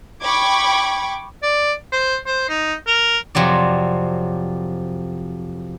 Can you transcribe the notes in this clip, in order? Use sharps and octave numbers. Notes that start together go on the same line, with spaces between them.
G5 B5 C#6 D6 G#6
D5
C5
C5
D#4
A#4
F2 C3 F#3 D5